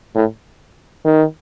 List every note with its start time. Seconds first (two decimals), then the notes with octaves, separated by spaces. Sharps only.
0.15 A2
1.05 D#3